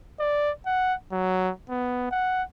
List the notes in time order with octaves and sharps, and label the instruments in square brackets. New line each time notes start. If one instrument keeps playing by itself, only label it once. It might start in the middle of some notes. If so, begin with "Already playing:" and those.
[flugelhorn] D5
F#5
F#3
B3
F#5